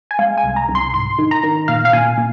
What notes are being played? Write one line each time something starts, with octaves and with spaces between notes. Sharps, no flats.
G#5
G#3 F5
G#5
C2
A#5
C2
C6
G#2 C6
D#3
A#5
D#3
A#2 F5
F5
A#2 G#5
A#2